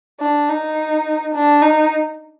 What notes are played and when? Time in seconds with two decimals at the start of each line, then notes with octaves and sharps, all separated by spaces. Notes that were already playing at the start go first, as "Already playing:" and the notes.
0.20 D4
0.49 D#4
1.35 D4
1.62 D#4